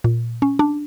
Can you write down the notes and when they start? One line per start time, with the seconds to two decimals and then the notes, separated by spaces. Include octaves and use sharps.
0.04 A#2
0.42 C#4
0.59 D4